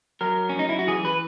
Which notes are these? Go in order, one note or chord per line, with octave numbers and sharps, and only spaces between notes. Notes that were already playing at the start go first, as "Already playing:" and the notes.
F#3 A#4
C#4
F#2
D#4
E4
F#4
E3 G#4
B4